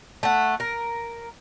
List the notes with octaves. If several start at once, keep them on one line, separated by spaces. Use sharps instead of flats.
A3 F#5
A#4